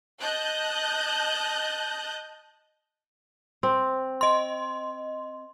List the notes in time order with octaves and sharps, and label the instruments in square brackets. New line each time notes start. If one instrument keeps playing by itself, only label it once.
[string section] D#5 A5 F#6 G6
[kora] C4
[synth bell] D#5 C6